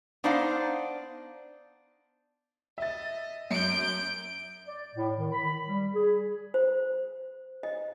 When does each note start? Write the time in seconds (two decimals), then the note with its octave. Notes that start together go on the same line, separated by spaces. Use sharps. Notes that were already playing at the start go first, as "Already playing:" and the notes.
0.24 B3 D4 D#4 C5 D5 F5
2.78 D#5 E5 A6
3.51 F#2 G6 D7
4.68 D5
4.95 A2
5.17 D#3
5.32 B5
5.68 G3
5.95 G#4
6.54 C5
7.63 D#5